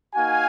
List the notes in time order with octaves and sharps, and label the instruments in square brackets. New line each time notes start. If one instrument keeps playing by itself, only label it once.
[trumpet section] A#3 D#4 F#4 F5 G#5